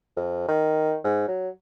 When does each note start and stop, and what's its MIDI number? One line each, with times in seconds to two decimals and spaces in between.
0.16 0.45 41
0.48 0.96 51
1.04 1.26 44
1.28 1.49 54